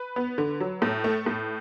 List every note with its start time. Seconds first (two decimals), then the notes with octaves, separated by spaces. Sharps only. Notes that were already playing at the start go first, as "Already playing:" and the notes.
Already playing: B4
0.16 B3
0.38 D3
0.60 F#3
0.82 A2
1.04 A3
1.26 A2